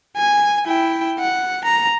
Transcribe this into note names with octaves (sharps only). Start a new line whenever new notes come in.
G#5
E4 G5
F#5
A#5